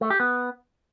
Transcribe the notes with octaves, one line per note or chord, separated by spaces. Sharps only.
A3
G4
B3